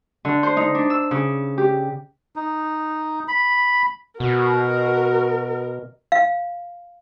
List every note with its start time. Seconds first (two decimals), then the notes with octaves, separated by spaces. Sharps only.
0.25 D3
0.43 C5
0.57 D#4
0.75 D4
0.90 E6
1.11 C#3
1.58 G4
2.36 D#4
3.28 B5
4.20 B2 F#4 A#4
6.12 F5